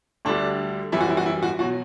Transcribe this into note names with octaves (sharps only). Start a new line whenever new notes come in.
D2 D3 G3 D4
F#2 E3 G3 E4
F#4
E4
F#4
E4
F#4
B2 F#3 F#4